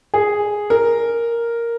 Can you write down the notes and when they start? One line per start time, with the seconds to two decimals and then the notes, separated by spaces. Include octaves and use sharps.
0.14 G#4
0.70 A#4